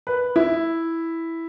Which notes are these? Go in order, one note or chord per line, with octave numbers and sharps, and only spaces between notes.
B4
E4